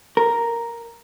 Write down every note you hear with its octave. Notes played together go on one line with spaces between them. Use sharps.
A#4